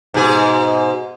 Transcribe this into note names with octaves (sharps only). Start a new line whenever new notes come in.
G#2 B2 G#4